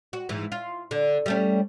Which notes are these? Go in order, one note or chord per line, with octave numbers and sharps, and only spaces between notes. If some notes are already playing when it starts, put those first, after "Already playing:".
F#4
G#2 E3
F4
D3
G3 A3 C#4